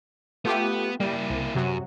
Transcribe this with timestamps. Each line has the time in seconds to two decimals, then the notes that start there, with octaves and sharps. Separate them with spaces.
0.45 A3 B3 F4 G4
1.00 G3 A#3 E4
1.30 C2
1.55 F#2 C3 F#3